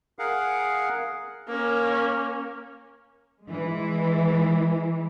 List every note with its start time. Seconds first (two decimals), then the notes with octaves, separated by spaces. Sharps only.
0.19 G#4 A#4 F5 F#5
1.48 A#3 C#4
3.46 E3 G#3